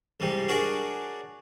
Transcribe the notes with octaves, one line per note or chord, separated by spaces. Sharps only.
C2 G#2 C3 G3
D4 F#4 G#4 A#4 C#5 D5